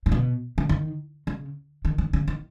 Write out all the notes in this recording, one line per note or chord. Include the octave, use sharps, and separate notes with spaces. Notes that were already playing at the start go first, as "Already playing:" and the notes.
A#2
B2
C#3
D#3
C#3
D#3
D#3
C#3
D#3